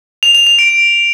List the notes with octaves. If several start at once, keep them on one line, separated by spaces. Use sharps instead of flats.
F7
F7
F7
D7